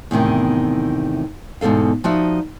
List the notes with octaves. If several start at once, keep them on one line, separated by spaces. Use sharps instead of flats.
E2 A2 C3 D#3
E2 G#2 B2 A4 F5
F3 D#4 F#4 D5 E5